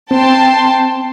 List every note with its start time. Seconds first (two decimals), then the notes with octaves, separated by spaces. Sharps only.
0.11 C4 G5 A5 C6